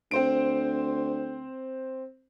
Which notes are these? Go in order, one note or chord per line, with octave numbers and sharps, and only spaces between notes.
D2 C4 C5 D7